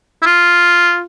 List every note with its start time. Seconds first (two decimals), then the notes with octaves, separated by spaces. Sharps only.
0.22 E4
0.26 F4